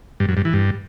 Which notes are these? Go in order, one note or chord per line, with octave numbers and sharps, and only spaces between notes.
G2
F#2
G2
E3
G2